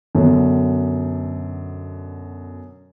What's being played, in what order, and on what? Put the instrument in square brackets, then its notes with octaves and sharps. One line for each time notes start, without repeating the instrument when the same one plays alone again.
[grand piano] F#2 B2 D3